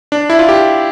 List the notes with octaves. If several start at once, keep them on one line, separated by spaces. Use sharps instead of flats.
D4
E4
F4
G4